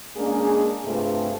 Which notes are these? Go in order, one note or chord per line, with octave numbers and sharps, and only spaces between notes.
G#3 A#3 C#4 D4 G#4
G2 C3 A3 F4 G#4